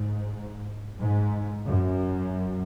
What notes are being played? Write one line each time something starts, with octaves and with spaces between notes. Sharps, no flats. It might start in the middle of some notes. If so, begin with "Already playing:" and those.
Already playing: G#2
G#2
F#2